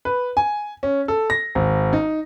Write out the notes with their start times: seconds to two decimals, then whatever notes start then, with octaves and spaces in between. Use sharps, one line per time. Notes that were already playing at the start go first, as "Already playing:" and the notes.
0.05 B4
0.37 G#5
0.83 C#4
1.08 A4
1.30 A#6
1.55 G#1
1.93 D#4